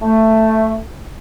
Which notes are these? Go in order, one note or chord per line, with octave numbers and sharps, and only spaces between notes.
A3